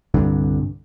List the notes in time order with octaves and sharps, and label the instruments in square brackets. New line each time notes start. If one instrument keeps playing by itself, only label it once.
[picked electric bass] C2 G2 D3